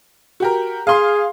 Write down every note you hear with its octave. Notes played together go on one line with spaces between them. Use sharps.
F#4 G4 A#4
G#4 F5 C6